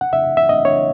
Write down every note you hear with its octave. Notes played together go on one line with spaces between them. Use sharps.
F#5
E5
E5
D#5
C#5